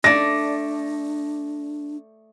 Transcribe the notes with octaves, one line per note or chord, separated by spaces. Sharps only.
A3 D4 D5 A#6